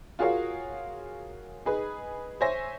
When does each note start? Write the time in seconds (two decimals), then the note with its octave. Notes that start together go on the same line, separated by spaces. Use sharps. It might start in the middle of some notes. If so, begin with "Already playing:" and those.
0.19 F4 F#4 G#4 A#4 C#5 F5
1.65 D#4 G#4 B4
2.41 C5 C#5 E5 G#5 A#6